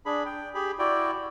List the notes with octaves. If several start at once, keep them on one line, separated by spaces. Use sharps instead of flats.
D4 G#4 B5
G5
G4 G#4 B5
E4 F#4 D5 G5